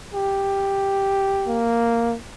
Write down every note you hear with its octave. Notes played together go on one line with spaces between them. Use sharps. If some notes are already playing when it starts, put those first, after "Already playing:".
G4
A#3